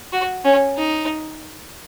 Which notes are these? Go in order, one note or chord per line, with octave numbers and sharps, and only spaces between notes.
F#4
C#4
D#4